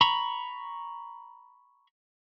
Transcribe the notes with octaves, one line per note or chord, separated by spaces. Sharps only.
A#5 B5 C#6